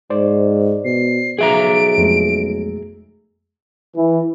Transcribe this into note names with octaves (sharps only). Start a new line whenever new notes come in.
G#2 C5 D5
B2 C7
B1 G#4 E5 A#5 D7
F2 G#3 A3
E3